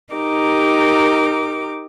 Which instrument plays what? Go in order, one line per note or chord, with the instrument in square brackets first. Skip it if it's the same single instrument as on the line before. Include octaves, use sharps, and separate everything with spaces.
[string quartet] D#4 G4 A#4 D6